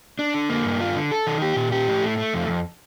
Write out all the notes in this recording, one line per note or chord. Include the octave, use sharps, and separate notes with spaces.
D4
D3
A#3
G2
F4
D3
A4
D#3
G4
A#2
G4
A2
A3
A3
F2
F2